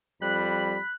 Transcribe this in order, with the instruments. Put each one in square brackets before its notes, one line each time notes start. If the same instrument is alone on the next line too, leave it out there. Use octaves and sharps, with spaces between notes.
[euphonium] F2 [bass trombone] G3 [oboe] B5 [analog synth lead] F#6